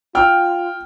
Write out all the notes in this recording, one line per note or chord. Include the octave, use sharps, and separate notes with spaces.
F4 G5 F6